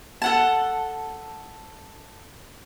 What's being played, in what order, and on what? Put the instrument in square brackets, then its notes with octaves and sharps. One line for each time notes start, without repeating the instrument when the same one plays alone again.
[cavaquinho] A4 F#5 A5